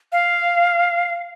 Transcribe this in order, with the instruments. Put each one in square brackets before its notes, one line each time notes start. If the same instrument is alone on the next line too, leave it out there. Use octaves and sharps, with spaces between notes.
[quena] F5